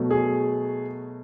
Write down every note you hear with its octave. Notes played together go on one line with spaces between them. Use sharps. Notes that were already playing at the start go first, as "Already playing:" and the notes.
Already playing: B2 F#3 A3
G#4